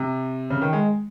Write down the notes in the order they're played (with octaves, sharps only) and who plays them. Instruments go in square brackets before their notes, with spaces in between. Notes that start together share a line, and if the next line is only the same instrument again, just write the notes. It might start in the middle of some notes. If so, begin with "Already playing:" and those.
Already playing: [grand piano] C3
C#3
D#3
G#3